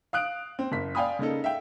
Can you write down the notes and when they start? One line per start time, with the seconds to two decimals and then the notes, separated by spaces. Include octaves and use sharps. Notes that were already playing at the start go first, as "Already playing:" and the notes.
0.13 F5 D#6 F#6 D7
0.59 C4
0.72 F#1 B6
0.95 D5 F5 G5 G#5 B5 D#6
1.19 C#3 A#3 D#4 A4
1.44 E5 F5 G5